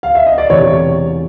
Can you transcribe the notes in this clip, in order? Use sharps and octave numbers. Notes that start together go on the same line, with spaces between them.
F5
E5
D#5
D5
E1 E2 C3 E3 C#5